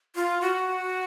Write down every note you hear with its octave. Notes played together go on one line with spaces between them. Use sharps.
F4
F#4